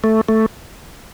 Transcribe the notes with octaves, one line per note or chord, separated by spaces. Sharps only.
A3
A3